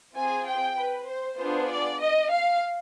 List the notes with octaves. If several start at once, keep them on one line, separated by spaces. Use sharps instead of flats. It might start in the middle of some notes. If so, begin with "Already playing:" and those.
C4 F4 G#4 G#5
G5
B4
C5
B3 D4 F4 G#4 C5
D5
D#5
F5